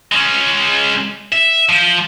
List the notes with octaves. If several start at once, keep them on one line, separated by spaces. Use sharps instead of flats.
G#3 C#4
E5
F3